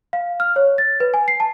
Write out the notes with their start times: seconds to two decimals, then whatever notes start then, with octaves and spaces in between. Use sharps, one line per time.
0.13 F5
0.40 F6
0.56 C#5
0.78 A6
1.00 B4
1.14 G#5
1.28 C7
1.40 A5